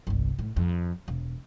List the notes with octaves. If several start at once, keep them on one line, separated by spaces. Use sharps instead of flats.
G1 C2
A2
F2
E1